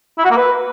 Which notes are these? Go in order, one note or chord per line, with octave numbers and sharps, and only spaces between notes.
E4
F#4
A#3
B4